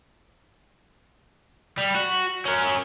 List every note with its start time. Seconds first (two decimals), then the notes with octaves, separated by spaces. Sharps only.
1.78 G3
1.95 F#4
2.45 C#4 A#4